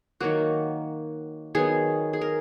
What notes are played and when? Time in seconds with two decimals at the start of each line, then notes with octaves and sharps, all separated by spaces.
0.20 D#3 F#3 A#3 F#4
1.55 D#3 F#3 B3 G#4
2.13 G#4
2.21 A#4